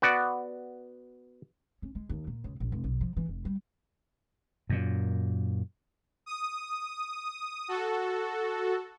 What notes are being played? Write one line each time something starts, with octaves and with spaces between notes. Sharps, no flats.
B3 F#4 D5
C#4
G#3
D#2
A#2
C#2
A#1
F1
B1
F3
E3
F1
G3
F#2 A#2
D#6
F#4 A4